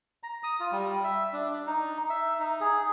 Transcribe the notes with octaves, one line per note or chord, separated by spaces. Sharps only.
A#5
D#6
F4
G3
E5
D4
D#4
E5
D#4
G#4